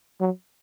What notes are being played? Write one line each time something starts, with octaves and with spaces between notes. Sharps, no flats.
F#3